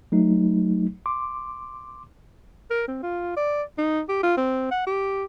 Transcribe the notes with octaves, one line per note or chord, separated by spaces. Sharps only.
F#3 A3 D#4
C6 D6
A#4
C4
F4
D5
D#4
G4
F4
C4
F#5
G4